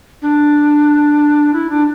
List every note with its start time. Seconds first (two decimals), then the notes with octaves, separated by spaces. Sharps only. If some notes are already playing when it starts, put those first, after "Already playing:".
0.22 D4
1.53 E4
1.70 D4